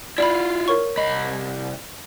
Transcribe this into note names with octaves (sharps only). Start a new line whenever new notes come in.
E4 F4 D5 B5
A#4 C#5 C#6
C2 D#5 B5